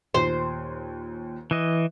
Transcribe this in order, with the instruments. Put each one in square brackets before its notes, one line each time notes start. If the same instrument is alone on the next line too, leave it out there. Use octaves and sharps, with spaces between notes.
[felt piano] D#2 A#2 [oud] C5
[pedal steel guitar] E3 D#5